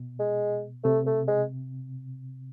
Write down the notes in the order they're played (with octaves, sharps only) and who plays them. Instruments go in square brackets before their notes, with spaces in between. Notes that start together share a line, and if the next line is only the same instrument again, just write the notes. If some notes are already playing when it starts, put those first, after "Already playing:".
Already playing: [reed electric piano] B2
[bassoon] G#3
[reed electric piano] C3 [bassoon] A3
[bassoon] A3
G#3